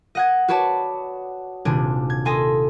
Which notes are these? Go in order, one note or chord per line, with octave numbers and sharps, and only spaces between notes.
D#5 F#5 G#6
F#4 B4 C#5 D5 A5
D#1 C3 D4 G#5
G#6
A4 D#5 G#5 C6